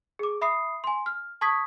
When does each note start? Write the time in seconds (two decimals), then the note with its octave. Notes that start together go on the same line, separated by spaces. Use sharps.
0.19 G#4 D6
0.41 E5 B5 D#6 C7
0.84 G#5 C6
1.06 F6
1.41 A5 C#6 D#6 G#6 B6